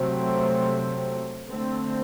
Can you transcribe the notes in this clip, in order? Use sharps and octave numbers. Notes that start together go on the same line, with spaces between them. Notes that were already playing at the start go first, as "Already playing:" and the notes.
Already playing: C3 F#3 A3 C4
D3 A3 C4